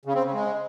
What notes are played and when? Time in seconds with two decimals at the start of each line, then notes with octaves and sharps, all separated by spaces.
0.05 C#3
0.15 C4
0.24 C#3
0.33 G#3